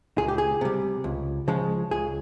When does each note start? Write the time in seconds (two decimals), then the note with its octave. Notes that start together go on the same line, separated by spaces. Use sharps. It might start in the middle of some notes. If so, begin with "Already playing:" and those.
0.18 C#2 G#4
0.28 G4
0.38 G#4
0.61 C3 G3
1.04 C#2
1.48 C#3 F3 G#3
1.91 C#2 G#4